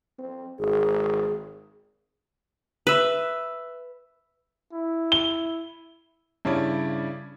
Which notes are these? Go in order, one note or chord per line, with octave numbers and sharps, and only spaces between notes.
C4
G#1 G#4
B4 E5
E4
G7
G2 C#3 E4 C#5 D5